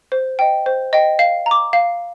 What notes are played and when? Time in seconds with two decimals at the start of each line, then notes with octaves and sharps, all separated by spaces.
0.12 C5
0.39 D#5 G5
0.66 C5
0.93 D#5 G5
1.19 F5
1.46 A#5
1.51 D6
1.73 F5